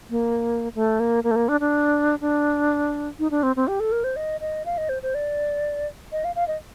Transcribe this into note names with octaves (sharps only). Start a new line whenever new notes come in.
A#3
A3
A#3
A#3
A3
A#3
D4
D4
D4
D#4
D4
C4
C4
G4
A4
A#4
C5
D#5
D#5
F5
D#5
C5
C5
D5
D#5
F5
F5
D#5